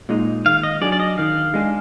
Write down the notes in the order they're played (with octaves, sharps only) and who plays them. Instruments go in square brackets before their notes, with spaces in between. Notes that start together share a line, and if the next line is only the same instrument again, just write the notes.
[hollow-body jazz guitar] A#2 G#3 D#4
[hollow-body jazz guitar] D#3 [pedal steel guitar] F5
[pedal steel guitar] D#5
[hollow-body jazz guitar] F#3 D4 G#4 [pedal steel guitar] D5
[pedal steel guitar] D5
D#5
[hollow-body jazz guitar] D#3 [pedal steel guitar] F5
[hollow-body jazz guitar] G#3 D4 G#4